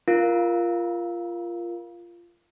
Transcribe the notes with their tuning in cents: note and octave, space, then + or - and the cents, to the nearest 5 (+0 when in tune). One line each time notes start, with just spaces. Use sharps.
F4 -15 A#4 +10 F5 +0